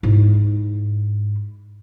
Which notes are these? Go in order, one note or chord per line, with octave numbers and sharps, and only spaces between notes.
G#2 E4